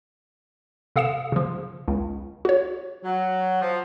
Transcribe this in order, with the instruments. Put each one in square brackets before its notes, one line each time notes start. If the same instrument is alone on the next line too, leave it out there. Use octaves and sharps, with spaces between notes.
[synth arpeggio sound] C3 A4 F5 D#6 C#7 E7
C#3 F3
C#2
F#4 C#5
[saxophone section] F#3
F3